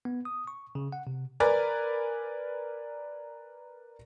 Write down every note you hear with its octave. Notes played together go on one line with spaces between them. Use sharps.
B3
D#6
C#6
C#3
F#5
C3
A#4 B4 D5 G#5